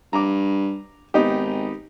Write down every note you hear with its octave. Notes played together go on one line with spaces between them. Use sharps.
G2 A#5 D6
G#1 B3 D#4 G4